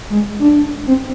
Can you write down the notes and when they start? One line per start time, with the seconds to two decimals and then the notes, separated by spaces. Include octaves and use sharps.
0.10 G#3
0.39 D4
0.87 C4